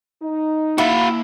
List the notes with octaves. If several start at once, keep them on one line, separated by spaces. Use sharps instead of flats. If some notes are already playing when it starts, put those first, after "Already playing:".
D#4
A#3 E4 F#4 F5 B5